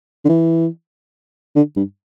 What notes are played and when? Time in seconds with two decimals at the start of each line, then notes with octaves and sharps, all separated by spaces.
0.25 D3
0.29 E3
1.56 D3
1.76 G2